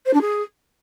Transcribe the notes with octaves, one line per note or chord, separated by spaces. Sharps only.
C5
D4
G#4